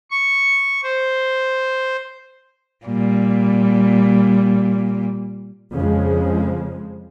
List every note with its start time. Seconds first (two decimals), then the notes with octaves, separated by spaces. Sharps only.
0.11 C#6
0.83 C5
2.86 A#2 G3
5.74 F2 C#3 F3 G#3